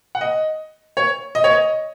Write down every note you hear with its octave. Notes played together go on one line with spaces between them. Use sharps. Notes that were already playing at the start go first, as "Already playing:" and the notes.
F#5
D#5
C#5
D#5
C#5
D#5